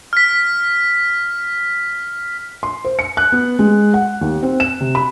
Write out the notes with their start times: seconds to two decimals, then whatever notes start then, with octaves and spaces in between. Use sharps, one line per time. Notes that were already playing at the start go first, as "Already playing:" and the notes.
0.13 F6 B6
2.63 C6
2.85 C5
2.99 C#7
3.17 F#6
3.32 B3
3.59 G#3
3.94 F#5
4.21 D#2
4.43 C4
4.60 E7
4.81 C3
4.95 B5